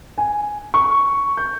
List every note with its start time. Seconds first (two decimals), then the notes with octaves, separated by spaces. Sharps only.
0.18 G#5
0.74 C#6
1.37 G6